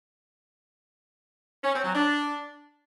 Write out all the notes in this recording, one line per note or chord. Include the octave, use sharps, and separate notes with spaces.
C#4
C4
F#3
D4